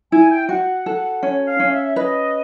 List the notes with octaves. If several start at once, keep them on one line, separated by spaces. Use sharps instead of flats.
E4 G#5
G5
F#4 F#5
A4
C#4
F5
C#4
E5
B4 D#5